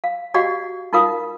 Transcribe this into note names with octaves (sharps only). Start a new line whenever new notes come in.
F5
F#4 G4 D5 D#5 F5 F#5
D#4 F4 A#4 F5 D#6